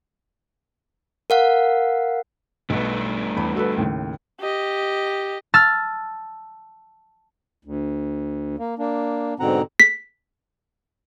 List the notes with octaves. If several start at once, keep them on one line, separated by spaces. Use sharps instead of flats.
A#4 F5 F#5
B1 G2 A3 B4
E2 B5
F#4 A4 B4
D#2 A2 C#3
G4 D#5
A5 E6 F6 A6
D2
A#3
A#3 D4
G#2 B2 D3 C4 F#5 A#5
B6